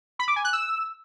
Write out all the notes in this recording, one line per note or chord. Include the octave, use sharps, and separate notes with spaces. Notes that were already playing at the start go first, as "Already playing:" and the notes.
B5
D6
G#5
F#6
E6